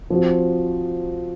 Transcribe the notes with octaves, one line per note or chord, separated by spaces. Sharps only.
F3 C4 F#4